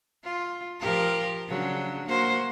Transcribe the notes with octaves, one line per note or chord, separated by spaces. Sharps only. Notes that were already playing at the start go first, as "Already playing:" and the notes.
F4
F3 G4 A#4
C#3 F#3 D4
A#3 F#4 C5